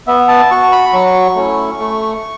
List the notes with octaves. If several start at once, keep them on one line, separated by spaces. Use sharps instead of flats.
B3 E5
A5
F#4 C#6
B5
F#3 C#6
A3 C#4 E4
A3